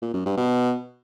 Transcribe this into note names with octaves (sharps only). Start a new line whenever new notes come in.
A#2
F#2
G2
B2